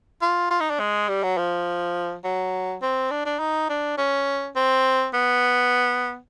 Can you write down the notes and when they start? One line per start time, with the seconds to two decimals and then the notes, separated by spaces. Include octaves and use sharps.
0.21 F4
0.51 F4
0.60 D#4
0.70 D4
0.79 G#3
1.08 G3
1.23 F#3
1.37 F3
2.24 F#3
2.82 C4
3.11 D4
3.25 D4
3.39 D#4
3.69 D4
3.97 C#4
4.55 C4
5.13 B3